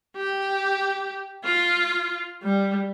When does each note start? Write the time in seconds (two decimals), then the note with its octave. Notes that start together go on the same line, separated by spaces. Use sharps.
0.16 G4
1.45 F4
2.43 G3